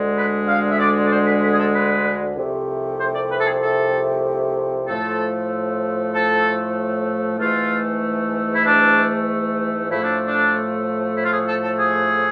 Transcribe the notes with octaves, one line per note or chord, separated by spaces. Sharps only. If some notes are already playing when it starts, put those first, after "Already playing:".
Already playing: D2 D3 G#3
B4
F5
E5
D5
D5
C5
B4
B4
G#4
A4
B4
C2 C3 F3 A3
C5
D5
B4
A4
G#4
A4
A2 F3 A3 A4
A4
G#2 E3 A3 F4
E4
D4
A2 F3 A3 E4
D4
D4
E4
F4
G#4
A4
A4
G#4